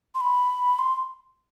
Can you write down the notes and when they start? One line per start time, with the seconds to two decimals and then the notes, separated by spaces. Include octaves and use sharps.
0.15 C6
0.20 B5
0.79 C6